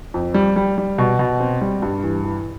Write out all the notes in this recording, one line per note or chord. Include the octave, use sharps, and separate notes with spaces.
F2
G3
G3
G3
B2
B2
C4
G3
G2
E3
E3